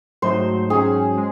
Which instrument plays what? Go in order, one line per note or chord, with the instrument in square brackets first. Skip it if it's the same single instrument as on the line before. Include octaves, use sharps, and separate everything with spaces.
[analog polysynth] G#2 F#3 A3 D#4 [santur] C5
[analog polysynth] G#2 F#3 C#4 [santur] G#4
[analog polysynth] G#3